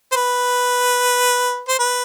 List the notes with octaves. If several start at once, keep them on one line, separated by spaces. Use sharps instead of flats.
C5
B4
C5
B4